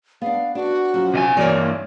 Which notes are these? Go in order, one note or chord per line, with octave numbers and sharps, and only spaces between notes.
B3 D4 F5
D4 F#4
F#2 F3
C3 D#5 G#5
G2 E3 A#3 C#5 D5